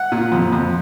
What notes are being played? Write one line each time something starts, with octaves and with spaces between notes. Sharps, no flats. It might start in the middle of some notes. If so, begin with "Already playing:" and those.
Already playing: F#5
A#2
F2
F2